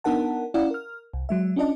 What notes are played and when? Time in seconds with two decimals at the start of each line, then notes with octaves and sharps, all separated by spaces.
0.04 B3 D4 D#4 A#4 F#5 A5
0.54 C#4 E4 D5 F5 F#5
0.71 A#4 F6
1.14 C2
1.29 F#3 G#3 E5
1.56 C#4 D4 F4 D5 D#5 A5